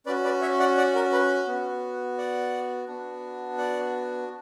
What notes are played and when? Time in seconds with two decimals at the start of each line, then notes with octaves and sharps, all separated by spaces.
0.06 C#4 F#4 B4 D5
0.24 B4 D5
0.41 C#5 E5
0.60 D5 F#5
0.77 D5 F#5
0.95 A#4
1.12 B4
1.48 B3 F#4
2.18 D5 F#5
2.88 B3 D4 F#4
3.58 D5 F#5